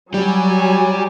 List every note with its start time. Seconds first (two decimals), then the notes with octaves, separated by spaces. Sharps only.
0.14 F#3 G3 G4 G#5